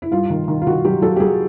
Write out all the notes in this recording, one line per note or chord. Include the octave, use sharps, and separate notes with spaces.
E4
G2 F4
D#3
D#3
F4
D#3 F#4
F#3 G4
F#3 A4
G4
F#3 G#4